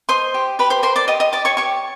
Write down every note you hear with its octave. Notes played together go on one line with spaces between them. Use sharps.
C5 D#5 C6
G4
G4 B4 B5
C5 C6
A#4 C5 C6
D5 D6
G4 D#5 D#6
D#5 D#6
G4 D5 D6
C#5 C#6
G4 C#5 C#6